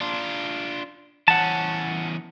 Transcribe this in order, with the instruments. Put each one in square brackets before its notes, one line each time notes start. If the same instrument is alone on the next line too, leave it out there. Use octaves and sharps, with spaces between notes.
[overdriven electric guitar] D4 F4
[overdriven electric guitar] E2 C#4 [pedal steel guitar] F#5 A5